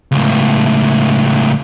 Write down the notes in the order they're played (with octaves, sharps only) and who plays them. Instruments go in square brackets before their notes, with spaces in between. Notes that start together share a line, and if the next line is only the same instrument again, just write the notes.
[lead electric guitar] C#2 A2